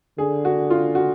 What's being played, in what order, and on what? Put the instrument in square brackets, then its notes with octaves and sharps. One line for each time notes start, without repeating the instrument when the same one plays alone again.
[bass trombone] D3 [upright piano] G#4
[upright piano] F#4
F4
F#4